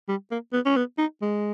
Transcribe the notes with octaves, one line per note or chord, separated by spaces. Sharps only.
G3
A#3
B3
C#4
B3
D#4
G#3